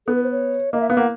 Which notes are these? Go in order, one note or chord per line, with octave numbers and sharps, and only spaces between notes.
B3 A4
B4
C5
C#5
A#3 D#5
E5
B3 F5
A#3 F#5